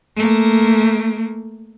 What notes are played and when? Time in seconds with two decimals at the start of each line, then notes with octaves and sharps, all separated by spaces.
0.16 A3 A#3